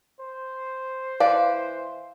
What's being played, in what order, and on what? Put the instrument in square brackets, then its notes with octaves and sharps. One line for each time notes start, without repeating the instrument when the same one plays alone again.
[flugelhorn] C5
[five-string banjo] E3 B4 D5 [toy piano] F5